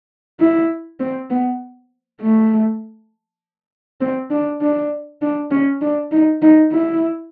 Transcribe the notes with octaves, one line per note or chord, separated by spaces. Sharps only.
E4
C4
B3
A3
C4
D4
D4
D4
C#4
D4
D#4
D#4
E4